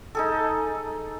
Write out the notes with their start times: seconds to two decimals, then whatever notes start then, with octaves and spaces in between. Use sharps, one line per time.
0.15 D#4 G#4 A4